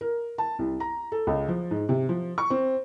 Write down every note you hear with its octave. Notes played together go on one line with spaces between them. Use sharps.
A#4
A5
C2
A#5
A4
C#2
F3
G#2
C3
F3
C#6
C4